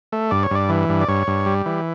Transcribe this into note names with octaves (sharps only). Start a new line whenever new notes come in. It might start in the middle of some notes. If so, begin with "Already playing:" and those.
A3
G2 D5
C#5
G2 D5
E3
G2
D5
G2 C#5
G2
G3
E3